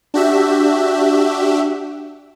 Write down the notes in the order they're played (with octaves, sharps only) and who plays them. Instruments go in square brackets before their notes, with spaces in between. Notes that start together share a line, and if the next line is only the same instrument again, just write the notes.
[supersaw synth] D4 F#4 G4 E5